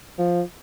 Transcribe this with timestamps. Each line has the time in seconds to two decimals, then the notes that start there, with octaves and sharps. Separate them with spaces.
0.18 F3